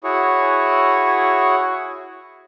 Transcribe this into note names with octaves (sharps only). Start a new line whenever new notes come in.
E4 F#4 G#4 C#5